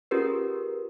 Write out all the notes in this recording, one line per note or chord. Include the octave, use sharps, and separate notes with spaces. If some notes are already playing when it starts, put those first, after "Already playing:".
C#4 F4 G4 G#4 A#4 B4